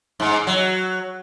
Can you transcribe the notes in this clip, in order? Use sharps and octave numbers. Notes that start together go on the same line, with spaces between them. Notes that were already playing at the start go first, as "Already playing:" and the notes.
G#2
F#3